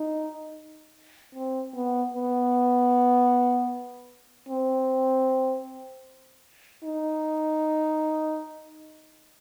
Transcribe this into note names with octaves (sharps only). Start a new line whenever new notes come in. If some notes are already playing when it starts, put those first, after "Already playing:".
Already playing: D#4
C4
B3
B3
C4
D#4